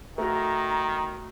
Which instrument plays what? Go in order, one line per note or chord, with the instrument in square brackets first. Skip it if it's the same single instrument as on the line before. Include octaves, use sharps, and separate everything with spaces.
[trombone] D#3 [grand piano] A3 F#4 [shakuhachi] A#5